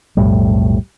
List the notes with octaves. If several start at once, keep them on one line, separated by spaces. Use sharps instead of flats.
B1 F2 A2 G3